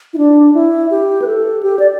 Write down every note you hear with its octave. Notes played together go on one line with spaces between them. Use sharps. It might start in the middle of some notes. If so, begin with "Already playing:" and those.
E4
D4
E4
G4
B4
A4
G4
D5